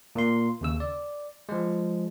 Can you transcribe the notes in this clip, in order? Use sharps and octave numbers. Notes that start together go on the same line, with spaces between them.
A#2 A#3 C6
D#2 C#3 E6
D5
F3 G#3